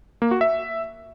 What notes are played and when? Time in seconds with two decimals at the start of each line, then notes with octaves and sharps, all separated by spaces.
0.22 A#3
0.31 F#4
0.41 E5